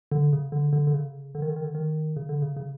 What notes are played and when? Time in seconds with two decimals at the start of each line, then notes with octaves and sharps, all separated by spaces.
0.12 D3
0.33 C#3
0.52 D3
0.73 D3
0.87 D3
0.94 C#3
1.35 D3
1.42 D#3
1.49 D3
1.56 D#3
1.64 D3
1.75 D#3
2.16 C#3
2.29 D3
2.42 C#3
2.57 C#3